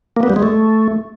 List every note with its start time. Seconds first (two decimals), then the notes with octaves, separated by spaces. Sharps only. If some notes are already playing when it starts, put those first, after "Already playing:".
0.16 A#3
0.23 B3
0.30 G3
0.36 G#3
0.43 A3